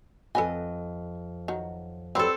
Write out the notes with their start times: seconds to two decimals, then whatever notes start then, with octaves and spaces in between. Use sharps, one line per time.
0.35 F2 A4 B4 D#5 G#5
1.48 D#3 F#3
2.15 F#3 G3 C4 A4 B4